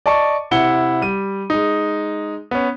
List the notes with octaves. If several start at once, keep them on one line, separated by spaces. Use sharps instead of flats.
D5 D#5 A5 C#6
C3 E4 F#5 C#7 G7
G3 D#7
G#3 D#4
B3 C#4